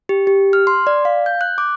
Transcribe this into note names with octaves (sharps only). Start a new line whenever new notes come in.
G4
G4
F6
C6
D5
F5
G6
F#6
D6